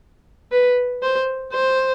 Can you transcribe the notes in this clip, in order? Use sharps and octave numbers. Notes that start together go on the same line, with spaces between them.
B4
C5
C5